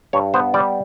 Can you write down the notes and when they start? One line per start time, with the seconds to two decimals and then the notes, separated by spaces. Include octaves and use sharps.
0.13 G2 C#5
0.34 B3 C5
0.54 G3 D5